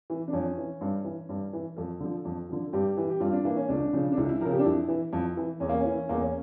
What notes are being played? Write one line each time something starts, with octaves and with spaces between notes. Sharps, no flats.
E3
D4
F2 C#4
E3
G2
E3
G2
E3
F2 A4
D3 F3
F2
D3 F3
G2 G4
E3
G4
G2 F4
D4
E3 A#3
C#4
C#2 D4
C#3 F3
D4
C#2 E4
E4
C#3 F3 A#4
G4
D4
F2 E4
E3
F2
E3
E2 C#4
A#3
C#4
E3
E2 A#3
C#4